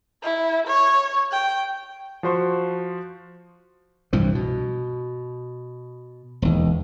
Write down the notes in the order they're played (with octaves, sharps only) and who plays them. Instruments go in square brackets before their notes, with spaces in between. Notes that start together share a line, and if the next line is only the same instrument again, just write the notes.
[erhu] E4
C#5
G5
[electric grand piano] F3 F#4 C5 C6 C#6
[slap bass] C2 G2 E3 F3
B2
E1 D#2